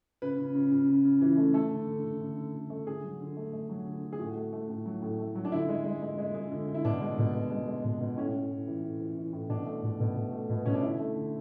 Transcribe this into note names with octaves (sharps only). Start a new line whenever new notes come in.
C#3 B4
C#3
C#3
C#3
C#3
C#3
E3
A3
A3 A4
D3
D3
D3
D3
D3
D3
A3
D3 G#4
F#3
D3
A3
A3
F#3
D3
D3
G#4
A2 F#4
A3
A3
A2
F#3
A2
A3
F#3
D4
D3 E4
G#3
G#3
G#3
G#3
G#3
D3
D3
E4
B2 D4
G#3
B2
B2
G#3
G#3
B2
B2
A2 C#4
A2
A2
E3
A2
E3
E3
A2
B2 D4
A3
B2
B2
B2
A3
B2
B3
B2 C#4
D4
D3 E4
A3
D3